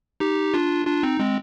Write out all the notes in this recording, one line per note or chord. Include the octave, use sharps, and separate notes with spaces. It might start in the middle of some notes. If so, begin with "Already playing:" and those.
D#4 G4
D4 F4
D4 F4
C4 D#4
G#3 C4